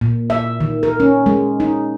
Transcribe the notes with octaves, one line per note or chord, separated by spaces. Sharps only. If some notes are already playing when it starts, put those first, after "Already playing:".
A#2
E5
D#3
A#4
C#4
G#3
D#4